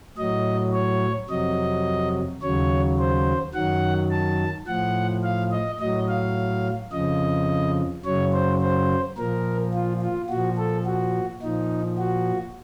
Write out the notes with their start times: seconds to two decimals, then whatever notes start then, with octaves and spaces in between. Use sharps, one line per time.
0.17 A2 F#3 D#5
0.73 C#5
1.30 F2 C3 F#3 D#5
2.42 D#2 C#3 F#3 C#5
2.99 C5
3.55 F#2 D#3 F#3 F#5
4.11 A5
4.68 A2 F3 F#5
5.23 F5
5.51 D#5
5.80 A2 F#3 D#5
6.08 F5
6.92 F2 C#3 F3 D#5
8.05 F#2 C#3 F#3 C#5
8.33 C5
8.61 C5
9.17 A#2 F3 A#4
9.73 F4
10.02 F4
10.30 A#2 F3 F#4
10.57 A4
10.86 F#4
11.42 A#2 F3 D#4
11.99 F#4